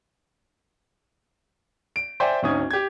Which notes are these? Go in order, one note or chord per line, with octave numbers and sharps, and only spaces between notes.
D7
C5 D5 E5 G5 G#5
G#1 D2 C#4 D#4 D#6 G#6
G4 G#6